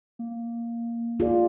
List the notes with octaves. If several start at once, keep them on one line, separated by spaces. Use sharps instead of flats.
A#3
F4 G#4 D5